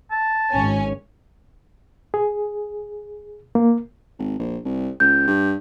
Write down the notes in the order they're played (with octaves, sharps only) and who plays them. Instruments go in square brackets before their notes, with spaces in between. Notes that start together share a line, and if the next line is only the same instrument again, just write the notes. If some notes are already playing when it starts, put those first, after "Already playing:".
[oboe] A5
[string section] G#1 C#4 G#5
[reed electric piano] G#4
A#3
[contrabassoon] G#1
A#1
C2
[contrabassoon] C#2 [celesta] G6
[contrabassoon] G2